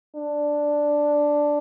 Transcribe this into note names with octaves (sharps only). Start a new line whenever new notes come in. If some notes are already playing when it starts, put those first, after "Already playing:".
D4